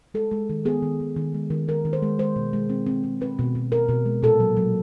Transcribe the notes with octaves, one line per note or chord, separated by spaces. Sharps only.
G#3 A4
G#3
D#3
B3 G#4
D#3
D#3
D#3
G#3
D#3
D#3 A#4
D#3
C5
G#3
G#3 C5
B2
G#3
C4
C4
G#3
C4 B4
B2
B2
B2 A#4
B2
G#3
A#2 A4
F#3
F#3